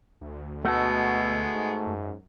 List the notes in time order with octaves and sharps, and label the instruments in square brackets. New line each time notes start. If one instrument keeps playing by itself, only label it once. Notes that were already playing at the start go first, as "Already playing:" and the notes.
[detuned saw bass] D2
[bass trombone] B2 [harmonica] G#3 B3 [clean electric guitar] A3 F#4 A4
[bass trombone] G#2
[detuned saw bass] F#2